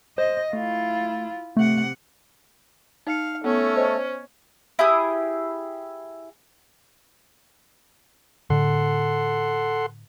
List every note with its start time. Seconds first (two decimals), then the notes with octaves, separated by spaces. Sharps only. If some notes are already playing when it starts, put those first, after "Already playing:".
0.18 C5 D#5
0.53 A3 E4 F4
1.57 C3 A3 F#5
3.07 D#4 F5 C#7
3.44 A3 B3 C#4 A4
3.76 C5 D#5
4.79 E4 G4 G#4 D#6
8.50 A2 D3 A4 F#5 C6